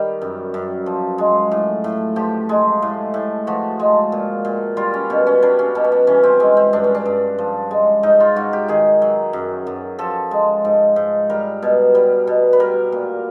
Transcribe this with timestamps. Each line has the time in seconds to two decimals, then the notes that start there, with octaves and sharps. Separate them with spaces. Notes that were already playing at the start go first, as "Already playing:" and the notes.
Already playing: D#3 G3 G4
0.22 F#2
0.54 F#2
0.86 F3
1.18 G#3
1.51 A2
1.84 A2
2.16 F3 G4
2.49 G#3
2.82 A2
3.14 A2
3.47 F3 F#4
3.79 G#3
4.12 A#2
4.45 A#2
4.77 G3 F4
4.94 C#4
5.10 B2 C#4
5.27 C#4
5.42 G3 D4
5.59 C#4
5.75 B2 D4
5.84 C#4
5.92 D4
6.07 E3 C#4
6.23 C4
6.40 G#3 C#4
6.57 C4
6.73 G2 D4
6.84 C#4
6.95 D4
7.06 G2
7.38 F3
7.71 G#3
8.03 G#2 D#4
8.20 F4
8.36 G#2 F#4
8.53 G4
8.68 D#3 G#4
9.02 F#3
9.33 F#2
9.67 F#2
9.99 F3 A4
10.31 G#3
10.65 G#2
10.96 G#2
11.30 G3 A#4
11.62 B2
11.95 G3
12.27 B2
12.53 B4
12.60 G3 A#4
12.92 A#2